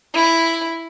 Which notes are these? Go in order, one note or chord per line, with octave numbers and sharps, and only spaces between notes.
E4